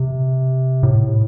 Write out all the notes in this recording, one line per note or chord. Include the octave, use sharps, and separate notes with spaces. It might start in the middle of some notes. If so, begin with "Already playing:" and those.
Already playing: C3
A2